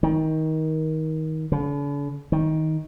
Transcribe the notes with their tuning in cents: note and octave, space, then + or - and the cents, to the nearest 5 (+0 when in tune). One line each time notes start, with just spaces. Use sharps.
D#3 +20
D3 -45
D#3 +15